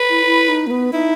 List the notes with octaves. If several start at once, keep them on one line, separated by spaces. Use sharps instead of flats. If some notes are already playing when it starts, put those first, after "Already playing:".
Already playing: B4
E4
E4
D#4
A#3
B3
D#4 E4